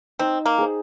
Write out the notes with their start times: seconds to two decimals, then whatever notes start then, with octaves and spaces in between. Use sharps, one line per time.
0.19 C4 D#4
0.46 A#3
0.58 G#4 C5